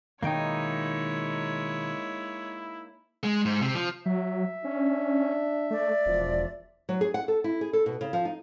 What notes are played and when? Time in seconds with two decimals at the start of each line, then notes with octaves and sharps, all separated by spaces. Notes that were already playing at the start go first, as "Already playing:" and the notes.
0.23 B2 D#3 G#3 A#3 D#4 E4 C#5 G5
3.23 G#3
3.45 G#2
3.61 C3
3.75 F3
4.06 F#3 E5
4.64 C#4 D4
5.71 A3 D5
6.06 E1 F3
6.89 F#3
7.01 G#4
7.14 F#5
7.28 A4
7.44 E4
7.61 G#4
7.73 A4
7.86 B2
8.01 C#3
8.13 F3
8.25 D#4